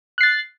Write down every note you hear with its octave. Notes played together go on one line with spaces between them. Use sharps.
F#6 A6 C7